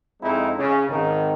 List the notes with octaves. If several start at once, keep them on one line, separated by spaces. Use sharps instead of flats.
F2 G#3 C4 D#4 E4
C#3
G#1 D#3